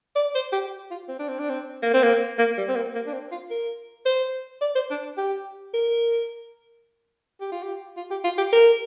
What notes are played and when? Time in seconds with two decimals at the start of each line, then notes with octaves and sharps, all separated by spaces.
0.15 D5
0.35 C5
0.52 G4
0.91 F4
1.09 C4
1.19 D4
1.28 C4
1.39 D4
1.49 C4
1.82 A#3
1.93 C4
2.03 A#3
2.38 A#3
2.57 G3
2.68 C4
2.75 A#3
2.95 A#3
3.07 D4
3.13 C4
3.31 F4
3.50 A#4
4.05 C5
4.61 D5
4.75 C5
4.90 D4
5.17 G4
5.74 A#4
7.40 G4
7.52 F4
7.63 G4
7.97 F4
8.11 G4
8.24 F4
8.38 G4
8.52 A#4